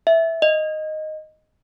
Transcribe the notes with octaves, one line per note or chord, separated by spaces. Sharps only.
E5
D#5